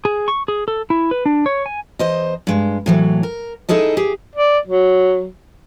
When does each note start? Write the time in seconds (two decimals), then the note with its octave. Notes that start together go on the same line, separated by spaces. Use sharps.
0.05 G#4
0.28 C#6
0.48 G#4
0.68 A4
0.90 E4
1.11 B4
1.26 D4
1.46 C#5
1.66 G#5
1.99 E2 C5 D#5
2.47 G2 G#3
2.86 A2 E3 F#3
3.23 A#4
3.69 D#4 E4 G#4 A4 D#5
3.97 G4 G#4
4.35 D5
4.67 F#3